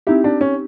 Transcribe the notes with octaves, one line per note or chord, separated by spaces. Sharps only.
C4 D#4 E4 G4
D4
C#4